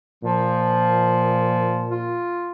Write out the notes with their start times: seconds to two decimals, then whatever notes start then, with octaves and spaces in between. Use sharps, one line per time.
0.23 A#2 F3
1.90 F4